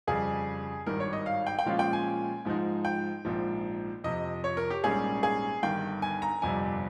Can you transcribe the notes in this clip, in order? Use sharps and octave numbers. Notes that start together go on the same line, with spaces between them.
F2 C#3 G3 G#4
G#1 G2 D#3 G3 A#4
C#5
D#5
F5
G5
G5
A#2 F3 G#3 C#4 F4 F5
G5
G#5
G#2 F3 G#3 D#4
G5
A#1 G#2 F3
F2 C3 F3 D#5
C#5
A#4
G4
A#1 G#2 G3 C#4 G#4
G#4
G1 G2 D#3 G5
G#5
A#5
G1 F2 C3 G3 G#5